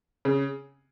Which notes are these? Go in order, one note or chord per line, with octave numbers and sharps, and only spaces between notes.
C#3